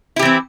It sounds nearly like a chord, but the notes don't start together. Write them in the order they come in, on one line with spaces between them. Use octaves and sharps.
E4 G4 E3 C4